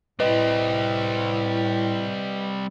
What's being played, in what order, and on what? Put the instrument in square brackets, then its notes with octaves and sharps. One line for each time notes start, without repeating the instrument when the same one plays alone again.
[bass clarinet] A2 [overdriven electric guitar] G3 C4 [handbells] B4 D#5